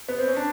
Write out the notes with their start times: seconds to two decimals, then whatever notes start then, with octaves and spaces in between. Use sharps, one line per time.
0.09 B3
0.18 C4
0.28 C#4
0.36 D4